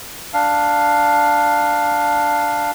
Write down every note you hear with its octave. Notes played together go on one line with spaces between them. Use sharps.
D4 F5